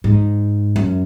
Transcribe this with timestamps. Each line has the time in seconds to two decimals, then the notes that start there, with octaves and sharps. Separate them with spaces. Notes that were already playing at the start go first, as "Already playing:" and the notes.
0.04 G#2
0.76 F#2